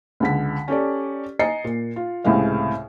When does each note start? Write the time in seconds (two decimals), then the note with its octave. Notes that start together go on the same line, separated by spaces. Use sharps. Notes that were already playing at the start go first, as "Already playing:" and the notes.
0.20 C#2 D3 B6
0.68 C#4 G4 A4 D5
1.39 D#5 G#5 A#5 A6 C7 C#7
1.64 A#2
1.96 F4
2.24 C#2 A2 C3 G#3 F5